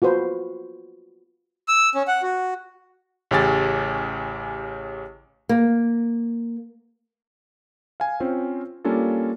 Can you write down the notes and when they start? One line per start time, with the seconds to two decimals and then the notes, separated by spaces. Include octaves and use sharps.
0.02 F4 F#4 B4 C5
1.68 E6
1.95 C#4
2.08 F#5
2.22 F#4
3.31 A1 C#3 C#4 G4 G#5 A6
5.49 A#3
8.00 F5 G#5
8.20 C4 C#4 F4 C5
8.85 G3 A#3 C#4 D4 F4 A4